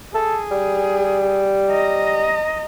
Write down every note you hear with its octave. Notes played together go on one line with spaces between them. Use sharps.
G#4 A4
G3
D#5 A#5